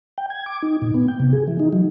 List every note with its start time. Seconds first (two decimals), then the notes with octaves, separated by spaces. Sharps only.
0.18 G5
0.30 G#6
0.46 D6
0.62 D#4
0.82 A#2
0.94 B3
1.08 G5
1.20 C3
1.33 G#4
1.48 E3
1.59 D#4
1.73 F#3